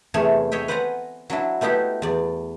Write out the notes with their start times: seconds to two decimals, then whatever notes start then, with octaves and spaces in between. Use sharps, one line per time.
0.14 E2 C3 A3 G#4 C#5
0.52 C#5 D#5 E5 G5
0.68 B4 C5 D5 F#5 G#5 A#5
1.30 F#3 D4 E4
1.61 A3 B3 D#4 E4 G4
2.02 E2 D5